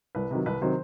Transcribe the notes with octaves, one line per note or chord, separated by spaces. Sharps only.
C2 B4
C3 D#3 F#3
C2 B4
C3 D#3 F#3 C5